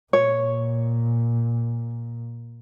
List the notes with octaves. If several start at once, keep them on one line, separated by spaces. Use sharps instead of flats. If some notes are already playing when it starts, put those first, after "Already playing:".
A#2 C#5